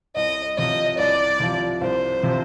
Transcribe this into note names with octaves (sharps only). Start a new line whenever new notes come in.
C2 D#5
C3 F3 D#5
C2 D5
C3 F3
C2 C5
C3 F3